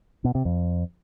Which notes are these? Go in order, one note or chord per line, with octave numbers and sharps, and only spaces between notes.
B2
C3
F2